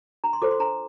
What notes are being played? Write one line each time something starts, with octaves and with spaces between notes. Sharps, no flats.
D4 A#5
C6
F4 A4 C5 D6
C6
D4 A#5